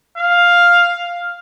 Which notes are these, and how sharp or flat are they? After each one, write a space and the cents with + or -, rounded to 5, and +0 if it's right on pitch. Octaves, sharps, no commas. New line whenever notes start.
F5 +5